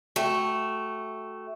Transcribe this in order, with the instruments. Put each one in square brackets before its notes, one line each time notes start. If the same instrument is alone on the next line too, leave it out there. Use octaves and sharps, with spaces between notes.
[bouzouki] A3 [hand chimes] F#4 G5 C#6